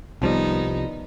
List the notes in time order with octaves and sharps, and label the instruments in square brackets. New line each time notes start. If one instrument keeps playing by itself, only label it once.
[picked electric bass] C2 F3 G3 [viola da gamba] D#3 B3 D#4